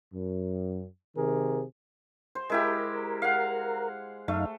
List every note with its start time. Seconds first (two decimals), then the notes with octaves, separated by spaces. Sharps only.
0.13 F#2
1.16 C3 D#3 G#4 A#4
2.35 C5
2.50 G#3 E4 G4 A#4
3.22 F5 F#5
4.28 F#2 A3 D#4 F5